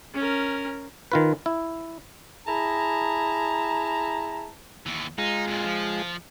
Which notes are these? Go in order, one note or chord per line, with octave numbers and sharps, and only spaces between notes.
C#4 A#4
D#3 F4 B4
E4
E4 G#4 A5 A#5
D#2 E3
G#3 D#4 F4
F2 A#2
F3